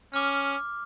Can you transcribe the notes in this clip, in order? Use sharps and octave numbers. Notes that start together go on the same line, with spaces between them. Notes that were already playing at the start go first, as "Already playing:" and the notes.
C#4 D6 F6